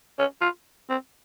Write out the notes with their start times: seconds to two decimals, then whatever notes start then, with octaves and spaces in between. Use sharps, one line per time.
0.19 C#4
0.41 F4
0.89 C4